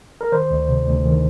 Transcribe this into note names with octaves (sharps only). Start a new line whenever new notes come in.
A#4
D#3 C5
D2
C3
D2
D#3